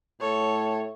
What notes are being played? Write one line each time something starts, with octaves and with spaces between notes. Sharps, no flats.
A2 A4 C#5